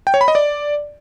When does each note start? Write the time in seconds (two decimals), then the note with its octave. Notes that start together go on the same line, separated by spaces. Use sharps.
0.07 G5
0.14 C#5
0.21 B5
0.28 D#5
0.35 D5